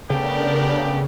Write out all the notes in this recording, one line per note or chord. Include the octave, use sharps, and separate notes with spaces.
C#3 A3 B3 D4 G4 A#4 D5